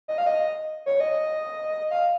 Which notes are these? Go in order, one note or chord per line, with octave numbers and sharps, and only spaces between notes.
D#5
F5
D#5
C#5
D#5
F5